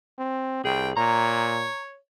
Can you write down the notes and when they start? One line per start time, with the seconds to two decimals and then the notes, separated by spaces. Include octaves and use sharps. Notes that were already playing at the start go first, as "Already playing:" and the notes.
0.18 C4
0.65 C2 G#4 G5
0.97 A#2 C#5 A#5